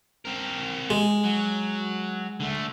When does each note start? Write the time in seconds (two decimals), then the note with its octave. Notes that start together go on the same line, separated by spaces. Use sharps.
0.25 C4 A#4
0.90 G#3
1.24 F#3
2.40 D3 A3